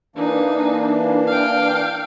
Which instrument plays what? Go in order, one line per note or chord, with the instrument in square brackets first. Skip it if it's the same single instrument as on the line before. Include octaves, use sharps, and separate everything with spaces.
[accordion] E3 A#3 D4 [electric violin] D#4
[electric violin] F5 G5